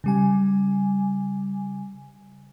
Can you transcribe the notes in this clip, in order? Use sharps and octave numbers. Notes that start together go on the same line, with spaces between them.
C#3 G3 G#5